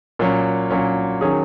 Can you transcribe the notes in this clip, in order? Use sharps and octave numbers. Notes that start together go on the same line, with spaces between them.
A#2 F#3 C#4
A#2 F#3 C#4
D#3 F#3 C#4 G#4